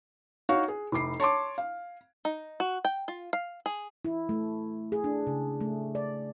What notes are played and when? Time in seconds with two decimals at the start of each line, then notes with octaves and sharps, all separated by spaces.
0.49 D#4 F#4 C#5 F5
0.68 G#4
0.92 F1 E4 D6 C7
1.20 C#5 A5 C6 D6
1.58 F5
2.25 D#4
2.60 F#4
2.85 G5
3.08 F4
3.33 F5
3.66 G#4
4.05 E4
4.29 A3
4.92 G#4
5.04 D4
5.27 C#3
5.61 A3
5.95 D5